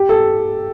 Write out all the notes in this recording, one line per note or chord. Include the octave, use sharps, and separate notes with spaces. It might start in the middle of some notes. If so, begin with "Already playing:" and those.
Already playing: G4
A4